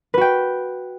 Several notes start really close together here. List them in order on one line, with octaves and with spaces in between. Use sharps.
B4 F#4 G5